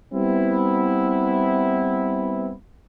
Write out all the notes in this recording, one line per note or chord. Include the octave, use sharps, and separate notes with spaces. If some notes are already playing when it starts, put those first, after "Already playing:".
G3 B3 C4 E4